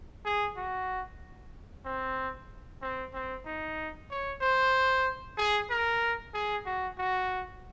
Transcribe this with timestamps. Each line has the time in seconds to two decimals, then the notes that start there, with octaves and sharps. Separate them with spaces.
0.25 G#4
0.57 F#4
1.85 C4
2.82 C4
3.13 C4
3.45 D#4
4.10 C#5
4.41 C5
5.37 G#4
5.70 A#4
6.34 G#4
6.66 F#4
6.98 F#4